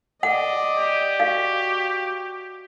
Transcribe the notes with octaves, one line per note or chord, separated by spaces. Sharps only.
D5 D#5 F#5
G4
F#4 F5